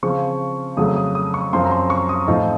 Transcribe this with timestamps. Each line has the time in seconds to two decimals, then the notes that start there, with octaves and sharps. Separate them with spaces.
0.03 C#3 F3 C4 C#6
0.77 F2 C#3 F#3 A3 D#6
0.96 D#6
1.15 D#6
1.34 C#6
1.53 F#2 F3 C4 C6
1.66 A#5
1.71 C6
1.90 C#6
2.09 D#6
2.28 A2 F3 C4 D#4